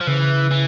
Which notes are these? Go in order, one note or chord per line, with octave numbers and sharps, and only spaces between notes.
F3
C#3 E3
E3